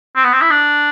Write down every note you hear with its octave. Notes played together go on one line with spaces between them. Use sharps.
C4
B3
C4
E4
D4